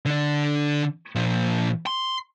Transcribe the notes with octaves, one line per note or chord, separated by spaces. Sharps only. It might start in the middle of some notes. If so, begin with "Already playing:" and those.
D3 D4
A#2 F3
C6